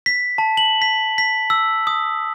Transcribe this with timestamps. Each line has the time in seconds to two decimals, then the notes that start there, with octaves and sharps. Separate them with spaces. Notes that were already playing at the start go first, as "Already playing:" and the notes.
0.06 B6
0.38 A5
0.57 F#7
0.82 B6
1.18 B6
1.50 E6
1.87 D#6